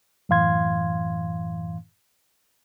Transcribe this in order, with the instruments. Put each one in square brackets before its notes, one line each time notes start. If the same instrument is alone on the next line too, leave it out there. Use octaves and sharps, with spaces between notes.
[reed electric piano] F#2 A2 E3 F5 C6 G#6